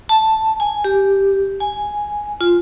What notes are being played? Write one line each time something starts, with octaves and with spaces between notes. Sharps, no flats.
A5
G#5
G4
G#5
F4